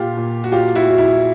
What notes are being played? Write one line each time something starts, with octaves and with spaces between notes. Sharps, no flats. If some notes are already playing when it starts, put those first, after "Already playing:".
Already playing: A#2 F4 G4
A#2
F#4
F#3 F4 G4
E4 F#4
F#3
E4